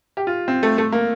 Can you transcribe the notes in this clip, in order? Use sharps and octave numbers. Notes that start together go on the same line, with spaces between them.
G4
F4
C4
A3
A3
A#3